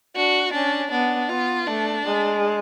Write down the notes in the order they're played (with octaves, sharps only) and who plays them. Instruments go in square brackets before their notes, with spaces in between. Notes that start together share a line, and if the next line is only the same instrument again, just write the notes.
[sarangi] D4 [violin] F#4
[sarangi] C#4 [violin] D4
[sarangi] B3 [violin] D4
[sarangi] B3 [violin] F4
[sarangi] A3 [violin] D4
[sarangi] G#3